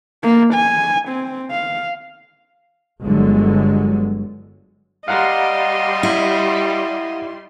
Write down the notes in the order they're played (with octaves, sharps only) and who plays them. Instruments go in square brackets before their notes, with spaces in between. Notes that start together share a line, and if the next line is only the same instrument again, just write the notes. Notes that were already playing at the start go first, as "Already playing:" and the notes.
[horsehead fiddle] A#3
G#5
C4
F5
[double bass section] G1 D3 F#3 G#3
[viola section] G3 C6 [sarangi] D#5 [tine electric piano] F5 F#5 A#5
[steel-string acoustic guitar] E4